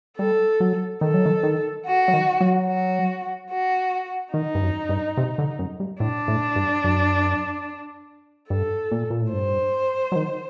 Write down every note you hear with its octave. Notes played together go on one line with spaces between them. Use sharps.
G3 A4
F#3
D#3 A4
F#3
D#3
D#3
F#4
F#3
D#3
F#3
F#4
F#4
D#3 D#4
G2
F#2
G2
C3
D3
F#2
G2
A2 D4
A2
G2
F#2
G2 A4
A#2
A#2
A2
G2 C5
F#3
D#3